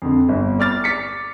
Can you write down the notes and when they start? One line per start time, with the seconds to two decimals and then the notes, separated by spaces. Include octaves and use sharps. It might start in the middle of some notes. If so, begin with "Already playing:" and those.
0.02 F2 D3
0.29 G1
0.59 D5 D6 F6 A6
0.84 D6 B6 C#7